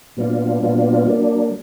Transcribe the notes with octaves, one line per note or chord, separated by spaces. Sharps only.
A#2 F#3 B3 D4 F4
A#2 F#3 B3 D4 F4
F#3 A#3 D4